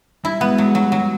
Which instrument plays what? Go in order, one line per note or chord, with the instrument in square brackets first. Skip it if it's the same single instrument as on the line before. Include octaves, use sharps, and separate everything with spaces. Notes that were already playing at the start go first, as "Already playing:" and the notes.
[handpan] G3 [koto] E4
[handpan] G#3 [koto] B3
[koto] F#3 [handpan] G#3
[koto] F#3 [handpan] G3
[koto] F#3
[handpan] G3